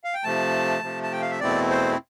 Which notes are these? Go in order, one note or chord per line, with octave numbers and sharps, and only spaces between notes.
F5
G5
C3 F3 A3 A5
C3 F3 A3
A5
G5
F5
E5
E2 B2 A3 C4 E4 D5
C5